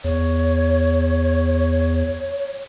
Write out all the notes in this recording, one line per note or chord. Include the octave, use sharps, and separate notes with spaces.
E2 C#5